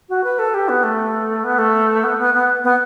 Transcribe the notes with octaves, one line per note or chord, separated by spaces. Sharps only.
F#4
B4
A4
G4
B3
A3
B3
A3
B3
B3
B3
B3